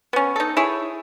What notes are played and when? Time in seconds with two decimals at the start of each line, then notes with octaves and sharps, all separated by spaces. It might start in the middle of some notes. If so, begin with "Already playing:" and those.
0.13 B3 C#4
0.36 D#4 A4
0.57 E4 G#4 C#5